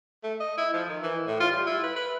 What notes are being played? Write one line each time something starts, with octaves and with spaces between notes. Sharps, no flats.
A3
D#5
E4
F3
D#3
E3
A2
F4
G3
E4
B4
B4